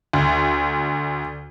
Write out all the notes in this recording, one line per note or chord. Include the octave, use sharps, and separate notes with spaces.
D2